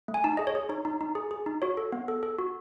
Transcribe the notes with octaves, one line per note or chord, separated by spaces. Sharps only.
A3
G#5
D#4 A5
G#4 D#5
C#5
G#4
D#4 C#5
D#4
D#4
G#4
G#4
D#4
F#4 C#5
A4
B3
A4
A4
F#4